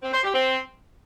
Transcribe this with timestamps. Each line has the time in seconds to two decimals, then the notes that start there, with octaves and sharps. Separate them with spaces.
0.02 C4
0.13 C5
0.24 G4
0.34 C4